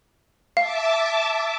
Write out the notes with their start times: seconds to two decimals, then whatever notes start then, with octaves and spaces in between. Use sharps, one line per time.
0.57 E5 F5 A5 D6